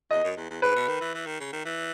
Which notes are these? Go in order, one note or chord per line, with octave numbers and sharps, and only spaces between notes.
E2 D#5
F#2
E2
E2
G#2 B4
B2
D#3
E3
E3
D#3
C#3
D#3
E3